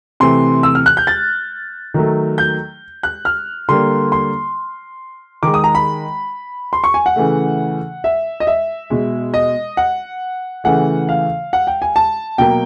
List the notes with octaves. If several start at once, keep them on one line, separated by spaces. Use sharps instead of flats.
C3 E3 A3 C6
E6
F6
F#6
G6
A6
D#3 F#3 A3
G6
F#6
F6
D3 G3 A#3 C6
C6
D#3 G#3 D6
D#6
A#5
B5
C6
C#6
G#5
F#5
C#3 E3 A3
E5
D#5
E5
B2 G#3
D#5
F#5
C#3 E3 A3 F#5
F5
F#5
G5
G#5
A5
B2 F#3 A#3 G5